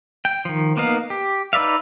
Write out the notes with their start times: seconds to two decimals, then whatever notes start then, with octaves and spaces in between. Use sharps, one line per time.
0.25 G5
0.45 D#3 F3
0.77 A#3 B3 D#4 F5
1.10 G4
1.53 D#4 B4 D5 E5 F5